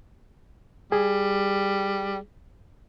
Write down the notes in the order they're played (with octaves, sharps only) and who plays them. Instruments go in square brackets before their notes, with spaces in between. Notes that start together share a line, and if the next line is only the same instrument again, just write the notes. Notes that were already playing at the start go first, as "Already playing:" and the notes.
[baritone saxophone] G3 [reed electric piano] G#4